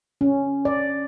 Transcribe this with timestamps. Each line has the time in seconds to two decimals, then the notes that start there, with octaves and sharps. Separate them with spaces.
0.21 C#4
0.65 D5